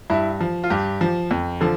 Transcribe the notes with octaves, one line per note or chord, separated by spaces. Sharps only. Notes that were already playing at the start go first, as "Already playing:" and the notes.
G2 E4
F3
F4
G2 G4
F3
F2
D3 F3